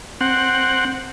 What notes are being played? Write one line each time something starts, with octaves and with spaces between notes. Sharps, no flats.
C4 F#5